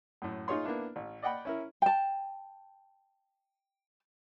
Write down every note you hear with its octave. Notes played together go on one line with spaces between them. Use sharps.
F#2 A2
D#4 F4 G#4 C#5 C6
A#3 B3 D4 E4
A1
D5 D#5 F#5 G5 B5
C#4 E4 A#4
G5 A5